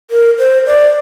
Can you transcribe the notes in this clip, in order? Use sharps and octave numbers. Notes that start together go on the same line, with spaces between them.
A#4
C5
D5